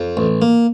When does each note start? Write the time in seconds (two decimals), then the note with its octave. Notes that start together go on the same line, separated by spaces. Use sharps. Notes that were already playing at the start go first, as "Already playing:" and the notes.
Already playing: F2
0.17 A1
0.42 A#3